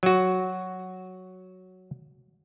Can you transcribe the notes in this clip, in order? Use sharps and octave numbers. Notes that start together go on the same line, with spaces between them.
F#3 F#4